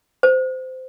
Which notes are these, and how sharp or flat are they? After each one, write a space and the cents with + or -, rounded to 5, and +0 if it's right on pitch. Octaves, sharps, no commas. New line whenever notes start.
C5 -20